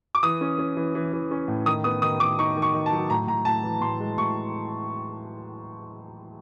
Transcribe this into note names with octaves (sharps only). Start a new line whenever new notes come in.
D6
E3 D#6
C#4
C#4
E3
E3
E3
C#4
A2
D#3 D#6
B3 D#6
D#3 D#6
D#3 D6
D#4 C#6
D#3
C#6
D#3
A5
F#3
A2 A#5
A2 A#5
A2 A5
E3
A2 C6
G#3
A2 C#6